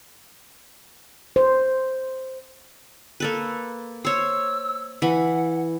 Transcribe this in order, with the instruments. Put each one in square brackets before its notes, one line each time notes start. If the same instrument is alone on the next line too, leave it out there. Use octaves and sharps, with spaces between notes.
[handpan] C5
[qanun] A#3 A4 B4
[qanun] C5 C#5 [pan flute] E6
[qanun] E3 B5 [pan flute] F#5